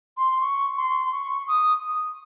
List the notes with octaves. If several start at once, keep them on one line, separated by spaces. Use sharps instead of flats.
C6
C#6
C6
C#6
D#6